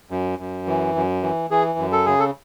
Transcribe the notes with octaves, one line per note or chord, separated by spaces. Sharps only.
F#2
F#2
E3
F#2
E3
E3 G#4
F#2
A4
C#3 G#4
A4